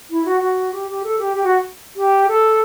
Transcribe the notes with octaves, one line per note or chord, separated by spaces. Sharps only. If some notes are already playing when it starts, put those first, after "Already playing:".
E4
F#4
F#4
G4
G4
A4
G4
G4
F#4
G4
A4